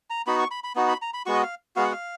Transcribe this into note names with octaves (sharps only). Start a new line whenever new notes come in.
A#5
B3 D#4 F#4 B5
C#6
B5
B5
B3 D#4 F#4
B5
A#5
B5
G#3 B3 F#4 C#6
D#5
F5
G#3 B3 F#4 F5
F#5
F5